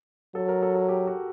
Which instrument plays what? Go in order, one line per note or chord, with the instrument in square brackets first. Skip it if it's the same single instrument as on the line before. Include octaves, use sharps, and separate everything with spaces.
[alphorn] F#3 [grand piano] A4
[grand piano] A#4
A4
A4
G4
F#4